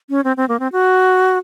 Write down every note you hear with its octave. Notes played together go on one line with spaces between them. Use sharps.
C#4
C4
C4
A#3
C4
F#4